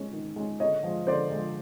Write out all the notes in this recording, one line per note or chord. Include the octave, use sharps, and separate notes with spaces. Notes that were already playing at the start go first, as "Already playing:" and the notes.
Already playing: G#3 C#4
D#3
G#3 C#4
D3 C#5 D#5
F3 G#3
D3 C5 D5
F3 G#3